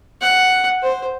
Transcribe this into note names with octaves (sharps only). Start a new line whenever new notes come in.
F#5
C5